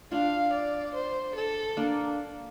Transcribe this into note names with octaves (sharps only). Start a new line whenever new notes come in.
D4 F4 F5
D5
C5
A4
A#3 D4